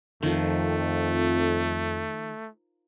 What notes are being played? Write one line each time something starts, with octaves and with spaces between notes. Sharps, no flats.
F2 D#3 F3 A3